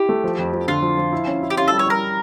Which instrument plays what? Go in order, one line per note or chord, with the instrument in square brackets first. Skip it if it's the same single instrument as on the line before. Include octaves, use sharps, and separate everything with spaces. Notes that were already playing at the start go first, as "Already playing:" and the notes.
Already playing: [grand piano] E4 [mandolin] G4
[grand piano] A3
F3
F2
F3
[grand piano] D3 [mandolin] F4
[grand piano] F3
F3
E4
C#4
E4
[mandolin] G4
[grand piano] C#4 [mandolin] F4
[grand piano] G3 [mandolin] A4
[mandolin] C#5
[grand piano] G3 [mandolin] A#4